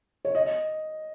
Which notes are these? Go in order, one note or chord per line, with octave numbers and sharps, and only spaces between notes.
C#5
D#5